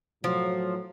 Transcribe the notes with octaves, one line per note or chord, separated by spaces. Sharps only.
A2 F3 F#3